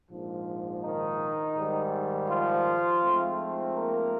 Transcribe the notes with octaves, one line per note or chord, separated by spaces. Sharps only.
A#1 G#2 F3
D#3 D#4
G#2 D#3 G3
F3 F4
G#2 F3 A3 C4
A#3 A#4